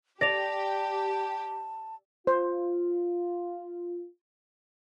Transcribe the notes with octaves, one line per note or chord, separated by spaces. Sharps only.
G4 D5 A5 A#6 F7
F4 C5